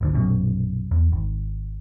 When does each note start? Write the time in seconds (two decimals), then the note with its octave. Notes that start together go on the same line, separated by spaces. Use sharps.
0.01 G#1 D2 D3
0.14 A#1 F#2 B2
0.91 E2
1.12 G#1